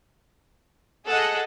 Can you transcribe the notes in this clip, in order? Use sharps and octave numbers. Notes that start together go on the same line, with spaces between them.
G#4 A4 D#5 F#5